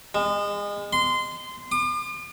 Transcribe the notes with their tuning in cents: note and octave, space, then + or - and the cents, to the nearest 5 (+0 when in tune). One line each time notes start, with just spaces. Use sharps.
G#3 -30
C6 -20
D6 +45